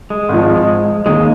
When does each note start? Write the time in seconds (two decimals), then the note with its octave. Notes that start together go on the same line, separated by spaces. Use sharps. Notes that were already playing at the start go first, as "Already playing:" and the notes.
0.10 G#3
0.29 G#1 G#2 F3
1.05 D#2 D#3 G#3 A#3